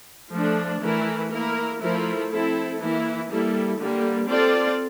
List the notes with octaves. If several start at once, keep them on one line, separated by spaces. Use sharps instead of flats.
F3 A3 D4
E3 A3 E4 A#4
A#3 E4 A#4
F3 A3 E4 A#4
C4 E4 A4
E3 A#3 E4
G3 A#3 E4 A4
D3 G3 A#3
C4 F4 A4 D5